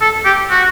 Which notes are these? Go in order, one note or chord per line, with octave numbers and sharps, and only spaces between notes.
A4
G4
F#4